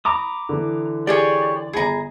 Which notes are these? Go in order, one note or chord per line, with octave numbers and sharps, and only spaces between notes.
A#5 B5 D6 D#6
D3 E3
G4 G#4 C#5 D5
G1 G#4 A#5 B5